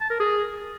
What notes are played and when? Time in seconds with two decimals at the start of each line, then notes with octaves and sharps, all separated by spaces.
0.01 A5
0.10 A#4
0.20 G#4